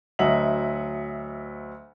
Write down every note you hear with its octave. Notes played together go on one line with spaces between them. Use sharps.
D2 F#3 D#5 E5 F#5 F#7